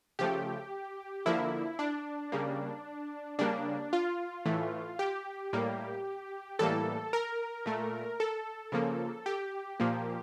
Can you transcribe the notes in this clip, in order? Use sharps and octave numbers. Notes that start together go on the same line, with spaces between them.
C#3 F3 A3 G4
D3 F3 A#3 E4
D4
C#3 G3 A#3
C#3 G3 A#3 D4
F4
A2 E3 A3
G4
A2 G3 A#3
A2 E3 G3 A#3 A4
A#4
A#2 A3
A4
C#3 F3 A#3
G4
A#2 F3 A#3